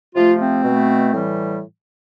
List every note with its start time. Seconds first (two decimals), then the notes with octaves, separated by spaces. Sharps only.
0.15 C3 F3 A3 F4
0.40 C4
0.64 B2 A3
1.13 A2 E3 G3